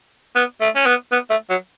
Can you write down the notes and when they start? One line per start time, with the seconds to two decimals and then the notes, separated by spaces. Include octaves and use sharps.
0.36 B3
0.61 A3
0.75 C#4
0.86 B3
1.12 B3
1.30 A3
1.50 F#3